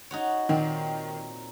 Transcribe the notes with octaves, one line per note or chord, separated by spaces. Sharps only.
D#4 F#4 C#5
A#2 D#3 C4